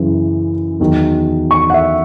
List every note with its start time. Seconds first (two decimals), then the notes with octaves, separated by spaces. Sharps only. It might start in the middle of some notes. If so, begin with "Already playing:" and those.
Already playing: F#2 C#3 E3
0.80 E2 D#3 F#3
1.51 C#6
1.70 F#5
1.74 E5